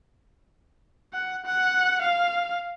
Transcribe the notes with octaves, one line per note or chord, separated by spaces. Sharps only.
F#5
F#5
F5